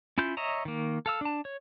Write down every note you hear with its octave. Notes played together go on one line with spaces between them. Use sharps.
C#4 E4 F4 G6
C#5 D#5 E5 A#5
D#3 A#3
A4 F5 E6
D4 A5
C#5